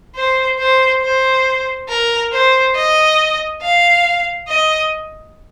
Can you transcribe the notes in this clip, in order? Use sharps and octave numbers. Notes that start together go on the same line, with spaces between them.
C5
C5
C5
A#4
C5
D#5
F5
D#5